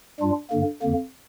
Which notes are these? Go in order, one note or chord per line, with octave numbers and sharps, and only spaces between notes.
G2 G3 D4 F4
G2 D3 A#3
F2 D3 A#3